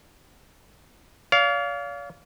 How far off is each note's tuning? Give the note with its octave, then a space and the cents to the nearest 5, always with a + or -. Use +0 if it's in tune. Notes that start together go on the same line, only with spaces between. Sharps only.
D5 -45 F5 +0